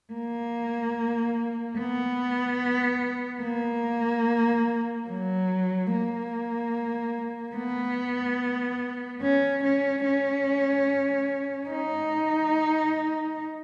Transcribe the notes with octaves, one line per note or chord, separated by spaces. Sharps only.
A#3
B3
A#3
F#3
A#3
B3
C#4
C#4
C#4
D#4